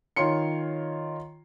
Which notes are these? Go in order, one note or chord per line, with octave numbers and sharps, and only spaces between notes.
D#3 F4 C#5 C6 C#7